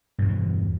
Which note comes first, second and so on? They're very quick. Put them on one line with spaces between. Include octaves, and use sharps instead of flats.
G2 B2 E2 E3